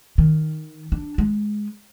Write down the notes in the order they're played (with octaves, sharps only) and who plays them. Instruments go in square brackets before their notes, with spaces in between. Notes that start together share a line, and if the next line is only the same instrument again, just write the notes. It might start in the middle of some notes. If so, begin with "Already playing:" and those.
[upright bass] D#3
D4
G#3